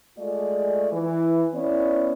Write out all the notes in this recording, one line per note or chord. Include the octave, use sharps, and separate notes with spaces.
G#3 A3 F4 G#4 D5
E3
B3 C#4 E4 D5